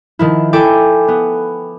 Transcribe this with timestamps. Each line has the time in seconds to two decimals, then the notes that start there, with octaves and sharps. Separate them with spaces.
0.19 D#3 F3 E4
0.53 E4 A4 G5 G#5 D6
1.08 B3